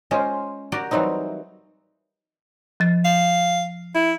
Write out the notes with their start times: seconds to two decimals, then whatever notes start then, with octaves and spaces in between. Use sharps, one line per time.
0.11 G#3 C#4 F4 C5
0.72 F#4 G4 A#4 D5
0.91 E3 F#3 G3 C4 D#4
2.80 F3 A6
3.05 F5
3.95 E4